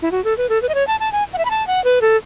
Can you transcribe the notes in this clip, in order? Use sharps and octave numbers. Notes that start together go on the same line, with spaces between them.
E4
F#4
A4
B4
A4
B4
D#5
C#5
A5
A5
G#5
F#5
E5
B5
A5
F#5
B4
A4